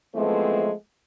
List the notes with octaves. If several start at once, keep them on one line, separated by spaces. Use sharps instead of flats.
E3 F3 G#3 A3 B3 C4